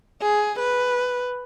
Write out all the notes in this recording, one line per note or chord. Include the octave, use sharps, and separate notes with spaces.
G#4
B4